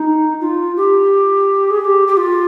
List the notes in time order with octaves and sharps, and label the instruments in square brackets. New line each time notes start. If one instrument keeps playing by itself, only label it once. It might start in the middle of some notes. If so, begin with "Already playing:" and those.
Already playing: [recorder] D#4
F4
G4
G#4
G#4
G4
G4
F4